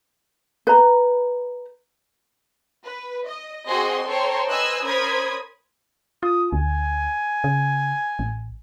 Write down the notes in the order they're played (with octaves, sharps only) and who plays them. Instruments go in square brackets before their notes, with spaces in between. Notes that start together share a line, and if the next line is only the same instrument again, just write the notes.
[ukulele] B4 A#5
[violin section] B4
D#5
C4 F#4 G#4 D#5 C6
A4 C5 C#5 G5 A#5 C6
B4 C5 D#5 G#5 E6 F#6
C#4 A#4 C5 B5 D#6 G#6
[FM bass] F4 [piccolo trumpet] D#6
[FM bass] D2 [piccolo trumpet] G#5
[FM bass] C#3
A1